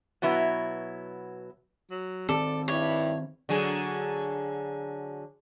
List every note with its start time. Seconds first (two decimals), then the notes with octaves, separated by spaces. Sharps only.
0.22 B2 F#3 B3 E4
1.91 F#3
2.29 D#3 C4 A4 D5
2.68 G2 G3 E4 C#5
3.49 D3 F#3 G#4